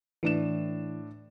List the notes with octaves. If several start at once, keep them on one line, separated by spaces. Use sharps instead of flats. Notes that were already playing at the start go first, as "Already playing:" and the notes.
A2 E3 D4 E7